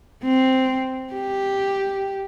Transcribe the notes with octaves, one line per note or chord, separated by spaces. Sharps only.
C4
G4